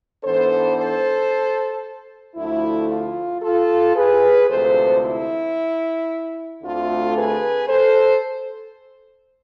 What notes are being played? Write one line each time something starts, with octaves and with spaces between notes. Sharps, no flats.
G#2 E3 B3 D4 A4 C5
A4 C5
D2 D3 F3 A3 E4
F4
F4 A4
G#4 B4
D2 C3 F3 G#3 A4 C5
E4
D2 D3 A3 C4 F4
G#4 B4
A4 C5